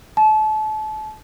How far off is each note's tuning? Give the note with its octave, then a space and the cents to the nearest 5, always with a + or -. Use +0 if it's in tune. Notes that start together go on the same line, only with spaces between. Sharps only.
A5 -30